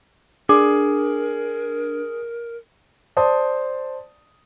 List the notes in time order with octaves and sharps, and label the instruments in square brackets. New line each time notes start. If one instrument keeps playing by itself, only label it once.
[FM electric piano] D4 [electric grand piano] G#4 [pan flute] A#4 [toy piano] D6
[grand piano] C5 D5 A5 D#6